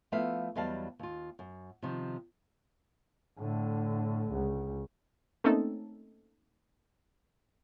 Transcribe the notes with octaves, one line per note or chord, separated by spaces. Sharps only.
F3 A3 B3 E4 E5 F5
E2 F#3 G3 D#5 F5 A5
D#2 F4
F#2
C3 D#3 F3
A2 D3
C#2
A3 A#3 C4 C#4 D#4 A4